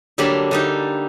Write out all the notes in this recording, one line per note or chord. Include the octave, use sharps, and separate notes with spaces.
D3 F#3 G3 A#3 A5 B5
D3 G3 D#4